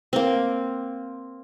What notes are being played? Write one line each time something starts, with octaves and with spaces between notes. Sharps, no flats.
A#3 C4